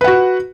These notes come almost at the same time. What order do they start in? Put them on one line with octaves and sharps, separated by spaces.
B4 F#5 F#4